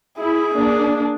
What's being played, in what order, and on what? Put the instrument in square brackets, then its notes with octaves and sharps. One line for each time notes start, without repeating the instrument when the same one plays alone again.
[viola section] E4 [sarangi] G#4
[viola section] A#3 D4